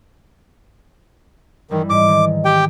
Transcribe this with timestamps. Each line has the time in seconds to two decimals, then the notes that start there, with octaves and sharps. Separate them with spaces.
1.71 G2 D#3 E3 G3
1.90 G#2 D6
2.08 D#3
2.45 G4 G5